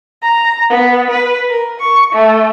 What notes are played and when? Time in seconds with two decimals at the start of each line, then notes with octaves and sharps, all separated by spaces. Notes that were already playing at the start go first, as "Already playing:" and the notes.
0.23 A#5
0.70 B3
1.11 B4
1.50 A#4
1.80 C#6
2.14 A3